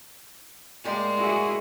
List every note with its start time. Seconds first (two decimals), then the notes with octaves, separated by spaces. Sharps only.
0.84 A2 G#3 A#3 G4 D5
1.17 E4 F#4 G#4